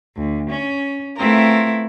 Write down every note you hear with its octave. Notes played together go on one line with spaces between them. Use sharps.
D2
C#4
A3 B3 C4 E4 F4 A#4